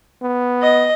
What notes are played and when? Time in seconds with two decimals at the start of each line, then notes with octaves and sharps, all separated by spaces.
0.22 B3
0.63 D#5